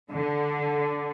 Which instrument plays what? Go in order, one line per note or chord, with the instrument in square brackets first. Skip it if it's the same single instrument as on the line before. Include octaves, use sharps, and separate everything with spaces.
[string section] D3